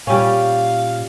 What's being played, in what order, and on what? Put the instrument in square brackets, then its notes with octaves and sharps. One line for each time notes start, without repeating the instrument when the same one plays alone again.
[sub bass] A#2 [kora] G3 C#4 [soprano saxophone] F5